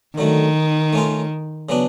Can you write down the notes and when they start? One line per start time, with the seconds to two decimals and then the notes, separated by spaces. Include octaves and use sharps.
0.18 D3 D#3 F#3 A3
0.93 A3 C#4 F4
1.69 C#3 F#3 B3 D4